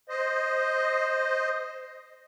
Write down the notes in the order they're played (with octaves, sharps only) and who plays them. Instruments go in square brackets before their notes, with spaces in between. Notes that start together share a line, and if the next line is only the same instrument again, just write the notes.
[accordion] C5 D#5